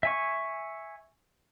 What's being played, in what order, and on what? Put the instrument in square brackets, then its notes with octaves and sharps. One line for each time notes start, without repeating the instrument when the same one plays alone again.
[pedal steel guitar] E5 G#5 C#6